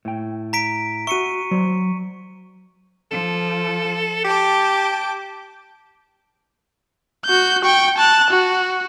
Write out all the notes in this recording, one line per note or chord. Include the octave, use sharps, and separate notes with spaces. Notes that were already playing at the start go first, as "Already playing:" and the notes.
A2 G5
A#5 B6 D7
F#4 E5 C#6 C#7 D#7
F#3 C5 D5
F3 A4
G4 G5 A5 D6
F#4 G6
G5 C#6
A5 F#6
F#4